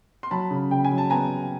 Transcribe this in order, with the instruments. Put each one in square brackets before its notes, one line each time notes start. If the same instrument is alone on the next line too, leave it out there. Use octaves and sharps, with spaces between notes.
[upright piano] C6
F#3 A5 B5
C#3
C#3 G5
G#5
F#3
A5
B3 G#5 A#5